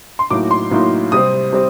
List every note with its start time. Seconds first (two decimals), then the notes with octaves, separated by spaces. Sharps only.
0.19 C6
0.30 A2 F#3 A#3 D#4 D6
0.51 C6
0.71 A2 F#3 A#3 D#4
1.12 C3 G3 C4 D#6
1.53 C3 G3 C4